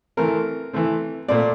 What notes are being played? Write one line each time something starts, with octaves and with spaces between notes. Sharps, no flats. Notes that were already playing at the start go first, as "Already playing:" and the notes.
E3 A3 C4 A#4
E3 A3 C4
A#2 A3 C4 D5